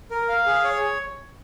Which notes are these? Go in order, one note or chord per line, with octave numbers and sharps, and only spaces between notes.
A#4
F5
G#4
C#5